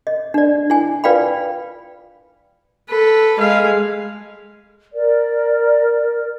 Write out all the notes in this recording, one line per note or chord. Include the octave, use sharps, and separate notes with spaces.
D#5
D4 D5
E4 G#5
F4 B4 D5 F5 G5 B5
A4 B4
G#3 F5
A#4 D5